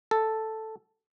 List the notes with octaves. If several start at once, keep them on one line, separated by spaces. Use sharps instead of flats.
A4